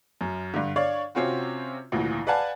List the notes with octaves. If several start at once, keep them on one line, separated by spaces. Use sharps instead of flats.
F#2
G2 D3
D4 C#5 D5 F5
C3 C4 C#4 F4 F#4
G#1 D2 A#2 E3
B4 D5 F5 F#5 G#5 A5